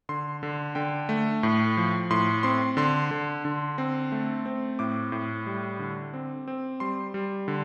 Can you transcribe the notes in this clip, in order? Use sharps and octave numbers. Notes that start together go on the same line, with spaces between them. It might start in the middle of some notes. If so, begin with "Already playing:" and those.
D3 C6
D3
D3 G5
A3
A2
F3
A2 C6
C4 C6
D3 C6
D3
D3
C4
A3
C4
A2 D6
A2
G3
D3
C4
C4
G3 C6
G3
D3